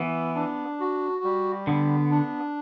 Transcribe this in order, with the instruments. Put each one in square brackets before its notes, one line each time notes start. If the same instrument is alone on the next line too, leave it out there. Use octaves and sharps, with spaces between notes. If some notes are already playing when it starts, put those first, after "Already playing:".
Already playing: [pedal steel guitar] E3 [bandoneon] B3
[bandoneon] D4
F#4
G3
[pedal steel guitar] D3 [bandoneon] B3
[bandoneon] D4